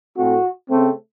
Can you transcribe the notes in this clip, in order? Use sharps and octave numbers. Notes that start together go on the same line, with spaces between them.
A2 A3 C4 F#4
C#3 A3 C4